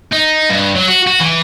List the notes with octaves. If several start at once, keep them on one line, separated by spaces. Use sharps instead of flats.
D#4
G2
F#3
F#4
F#4
E3